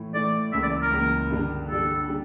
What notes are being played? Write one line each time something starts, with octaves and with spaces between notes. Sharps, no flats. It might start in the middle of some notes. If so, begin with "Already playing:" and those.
Already playing: A2 E3 A3
A2 E3 A3 D5
C#2 C#3 E3 A#3 E5
D5
A#4
C#2 C#3 E3 A#3
G2 D3 G3 D4
G2 D3 G3 D4 A4
C#3 G3